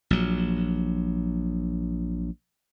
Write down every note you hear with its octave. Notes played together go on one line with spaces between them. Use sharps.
A#1 F#3